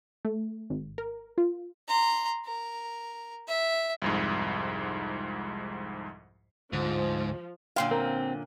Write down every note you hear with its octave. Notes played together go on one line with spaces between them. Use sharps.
A3
G#1
A#4
F4
A#5 C6
A#4
E5
C2 F2 G#2
D2 G#2 D3 F3
F#2 A#2 D3 F5 G5 C6
C4 A#4